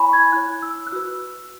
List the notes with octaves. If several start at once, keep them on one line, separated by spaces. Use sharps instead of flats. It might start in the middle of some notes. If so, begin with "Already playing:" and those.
Already playing: E4 C#5 G#5 B5 C#6
G#6
E4 C#5 F#6
E6
F#6
F#4 B4 E6